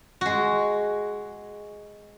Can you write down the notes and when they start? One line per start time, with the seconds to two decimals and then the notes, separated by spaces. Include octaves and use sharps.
0.21 G#3 F#4